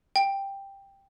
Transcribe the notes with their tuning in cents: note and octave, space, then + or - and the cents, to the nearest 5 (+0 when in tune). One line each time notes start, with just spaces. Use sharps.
G5 +5